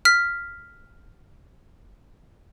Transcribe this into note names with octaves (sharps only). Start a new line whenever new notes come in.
F6 B6